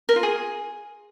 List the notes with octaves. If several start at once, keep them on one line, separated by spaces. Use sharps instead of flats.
A#4
F4
G#4